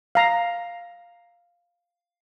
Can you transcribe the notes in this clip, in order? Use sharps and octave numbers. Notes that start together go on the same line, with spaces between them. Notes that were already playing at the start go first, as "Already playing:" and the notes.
F5 A#5